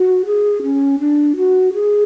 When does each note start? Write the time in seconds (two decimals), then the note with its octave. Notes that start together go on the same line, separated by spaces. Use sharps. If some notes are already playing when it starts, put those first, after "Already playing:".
Already playing: F#4
0.26 G#4
0.63 C#4
1.00 D4
1.37 F#4
1.73 G#4